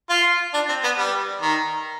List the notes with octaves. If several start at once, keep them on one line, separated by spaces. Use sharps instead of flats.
F4
D4
C4
B3
G3
D#3